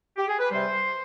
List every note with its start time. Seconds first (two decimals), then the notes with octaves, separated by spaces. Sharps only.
0.17 G4
0.28 G#4
0.39 B4
0.50 C3 G3 C5